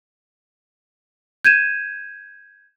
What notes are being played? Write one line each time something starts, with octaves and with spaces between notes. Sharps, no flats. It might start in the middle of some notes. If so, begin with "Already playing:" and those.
G6 G#6 D#7 E7